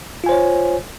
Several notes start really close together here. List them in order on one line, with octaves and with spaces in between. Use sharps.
F4 G#5 C5 C#5